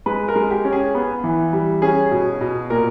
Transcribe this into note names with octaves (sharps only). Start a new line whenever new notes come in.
G#3 B4
A#4
G#3
G4
C#4
G#4
B3
E3
G3
C#4 G#4
B2
B2
A#2 A#4